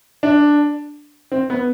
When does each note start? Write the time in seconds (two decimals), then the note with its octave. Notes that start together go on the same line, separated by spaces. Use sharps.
0.23 D4
1.32 C4
1.50 B3